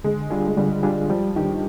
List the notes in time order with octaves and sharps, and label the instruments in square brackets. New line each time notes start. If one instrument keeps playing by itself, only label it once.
[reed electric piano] D3 [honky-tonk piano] G#3
[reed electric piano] G3 D4 F4 G#4
[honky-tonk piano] G#3
[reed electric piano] D3 [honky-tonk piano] G3
[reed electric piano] G3 D4 F4 G#4
[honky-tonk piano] F3 [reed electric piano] G3
[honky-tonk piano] D#3 [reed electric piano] D4 G4